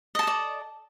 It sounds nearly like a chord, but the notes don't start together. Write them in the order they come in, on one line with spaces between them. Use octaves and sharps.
D#5 A5 A4 D5